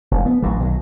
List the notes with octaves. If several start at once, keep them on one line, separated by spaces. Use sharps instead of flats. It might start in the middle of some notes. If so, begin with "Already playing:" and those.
F1
B3
A1 G2 F#3
B1 D#3 F#3